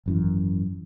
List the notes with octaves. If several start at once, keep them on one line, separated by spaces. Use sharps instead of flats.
G#1 F#2 E3